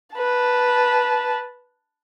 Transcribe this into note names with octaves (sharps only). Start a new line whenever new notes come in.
B4 A5